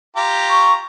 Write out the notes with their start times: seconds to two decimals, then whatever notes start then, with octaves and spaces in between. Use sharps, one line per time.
0.16 F4 G4 A#5
0.50 C#6